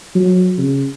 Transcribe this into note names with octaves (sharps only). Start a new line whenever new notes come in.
F#3
C#3